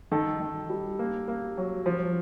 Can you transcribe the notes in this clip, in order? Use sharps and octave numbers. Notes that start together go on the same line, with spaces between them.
D#3 A4
D#3
G3
A#3
A#3
F#3
F3